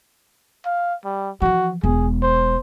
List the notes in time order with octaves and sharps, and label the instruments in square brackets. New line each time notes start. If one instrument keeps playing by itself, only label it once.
[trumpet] F5
G3
[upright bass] E3 F3 [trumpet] F#4
[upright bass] E1 [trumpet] G#4
[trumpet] C5